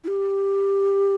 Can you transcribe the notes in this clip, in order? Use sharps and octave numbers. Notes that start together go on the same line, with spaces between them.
E4
G4